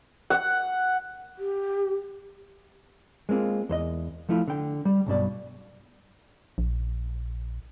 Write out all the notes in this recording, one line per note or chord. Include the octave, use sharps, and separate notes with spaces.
F#5
G4
G#3 A#3 C4 F4
E2 C5 D#5
F3 A3 E4 F4
D3 G5
G3
B1 G2 B2 D5
A#1